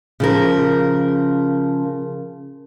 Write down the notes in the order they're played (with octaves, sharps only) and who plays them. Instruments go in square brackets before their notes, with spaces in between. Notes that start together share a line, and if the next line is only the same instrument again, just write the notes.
[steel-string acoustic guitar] C#3 F3 A#4